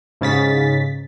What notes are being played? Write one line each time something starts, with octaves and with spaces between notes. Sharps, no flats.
G#2 C#3 A6 B6